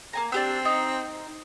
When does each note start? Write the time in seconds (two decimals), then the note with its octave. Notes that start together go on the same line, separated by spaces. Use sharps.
0.13 A#3 G#5 A#5
0.32 C4 D4 G4 E6
0.65 D#4